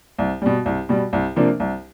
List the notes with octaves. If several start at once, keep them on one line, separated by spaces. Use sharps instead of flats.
C2
B2 G3
C2
B2 G3
C2
C3 F3 A#3 D4
C2